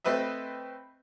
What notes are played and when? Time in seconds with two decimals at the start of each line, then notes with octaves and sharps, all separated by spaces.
0.04 A3 C4 B4 D#5 E5